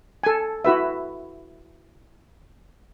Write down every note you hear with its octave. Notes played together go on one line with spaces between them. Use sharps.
A4 G#5
E4 F#4 B4 E5